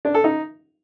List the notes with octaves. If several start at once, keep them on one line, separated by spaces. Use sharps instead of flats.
D4
A4
D#4